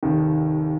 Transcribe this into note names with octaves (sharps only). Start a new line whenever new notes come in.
F1 D#2 D#3